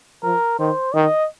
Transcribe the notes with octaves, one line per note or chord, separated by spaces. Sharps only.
F3 A#4
D#3 C5
D#3 D#5